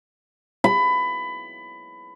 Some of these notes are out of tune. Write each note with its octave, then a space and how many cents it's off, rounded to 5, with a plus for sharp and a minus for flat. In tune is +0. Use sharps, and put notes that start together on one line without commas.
B5 +20